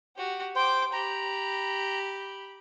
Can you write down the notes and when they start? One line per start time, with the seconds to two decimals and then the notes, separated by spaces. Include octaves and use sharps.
0.16 F#4 G4
0.55 C5 G5 D6
0.93 G4 A#5 B5